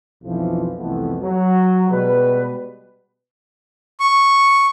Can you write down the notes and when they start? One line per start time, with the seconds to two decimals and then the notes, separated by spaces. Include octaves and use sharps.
0.24 B1 F2 E3 F3
0.78 C2 F2 E3 A3 B3
1.21 F#3
1.89 B2 G3 G#3 B4
4.00 C#6